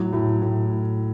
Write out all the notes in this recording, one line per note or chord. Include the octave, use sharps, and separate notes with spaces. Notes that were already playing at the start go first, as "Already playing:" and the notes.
Already playing: A2 F#3
A2
A2